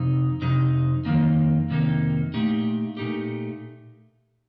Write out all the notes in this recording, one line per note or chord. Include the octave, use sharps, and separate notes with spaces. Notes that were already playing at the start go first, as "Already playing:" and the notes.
Already playing: F2 C3 D#4
F2 C3 D#4
F2 C3 D#3 A#3 D#4
F2 C3 D#3 A#3 D#4
A#2 A3 D#4 G4
A#2 A3 D#4 G4